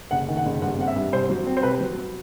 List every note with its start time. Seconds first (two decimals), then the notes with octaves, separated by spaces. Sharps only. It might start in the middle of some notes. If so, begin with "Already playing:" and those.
0.11 F#1 F#5
0.28 D#3
0.37 F#5
0.46 F#1
0.62 G2 F#5
0.79 C4 F#5
0.88 E5
0.96 G2
1.13 C2 C5
1.30 F#3
1.46 C4
1.57 C5
1.63 C2 B4
1.81 F#3